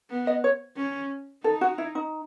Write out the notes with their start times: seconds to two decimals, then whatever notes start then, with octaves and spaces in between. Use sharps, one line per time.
0.10 B3
0.27 D#5
0.44 C#5
0.77 C#4
1.44 D#4 A4
1.61 F#4
1.78 E4
1.95 D#4